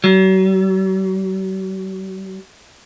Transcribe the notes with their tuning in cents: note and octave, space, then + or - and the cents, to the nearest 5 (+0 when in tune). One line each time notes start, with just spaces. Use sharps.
F#3 +45